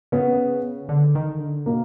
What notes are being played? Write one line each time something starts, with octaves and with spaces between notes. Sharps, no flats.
C#3 B3
D3
D#3
D3
B2 A#3